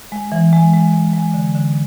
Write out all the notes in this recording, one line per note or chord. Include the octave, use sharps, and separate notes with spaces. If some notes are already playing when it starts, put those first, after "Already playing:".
G#3
E3
G#3
G#3
G#3
G#3
D3
D3